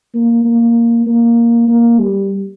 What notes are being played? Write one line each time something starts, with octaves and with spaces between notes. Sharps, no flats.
A#3
A#3
A#3
A#3
G3